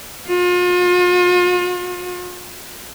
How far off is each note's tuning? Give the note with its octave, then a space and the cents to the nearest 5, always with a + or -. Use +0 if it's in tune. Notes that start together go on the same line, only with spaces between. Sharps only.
F4 +40